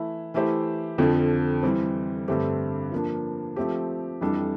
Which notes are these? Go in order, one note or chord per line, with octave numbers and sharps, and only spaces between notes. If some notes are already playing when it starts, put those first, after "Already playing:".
Already playing: E3 A3 E4
E3 A3 E4 G4 C5
F2 D3 F3
E3 G3 C4
G2 D3 A3 C4 G4
F3 A#3 D4
F3 A3 C4 G4
F2 E3 G3 D4 A4